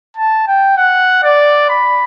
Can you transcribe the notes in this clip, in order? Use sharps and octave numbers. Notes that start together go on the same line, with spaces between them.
A5
G5
F#5
D5
B5